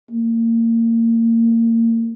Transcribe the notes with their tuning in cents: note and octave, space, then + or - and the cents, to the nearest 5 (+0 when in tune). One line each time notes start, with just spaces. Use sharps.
A#3 -30